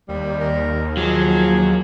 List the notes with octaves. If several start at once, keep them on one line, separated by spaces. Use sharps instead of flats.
D#2 G3
A#4
F3 F#3 G#4